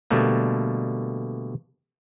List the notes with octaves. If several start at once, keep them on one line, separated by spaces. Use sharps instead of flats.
B2 D3 G3 A3 A#3